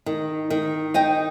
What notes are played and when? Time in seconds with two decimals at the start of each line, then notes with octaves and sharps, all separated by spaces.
0.06 D#3
0.50 D#3
0.94 D#4 D#5 G5